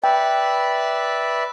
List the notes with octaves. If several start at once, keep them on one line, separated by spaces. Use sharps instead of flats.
B4 D5 E5 G5